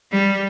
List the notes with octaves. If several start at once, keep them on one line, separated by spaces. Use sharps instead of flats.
G3